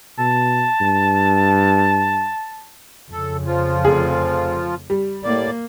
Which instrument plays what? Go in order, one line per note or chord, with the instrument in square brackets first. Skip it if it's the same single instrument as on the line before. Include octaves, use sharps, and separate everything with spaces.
[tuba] B2 [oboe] A5
[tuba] G2
[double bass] F2 C#3 [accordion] A4
[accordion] F3 F4
[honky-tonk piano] F1 G#4
G3
[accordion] A2 D5 [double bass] A#3